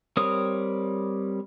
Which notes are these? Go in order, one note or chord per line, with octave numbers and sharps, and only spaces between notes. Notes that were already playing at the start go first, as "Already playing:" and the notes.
G3 C4 A#4 C#5 D#6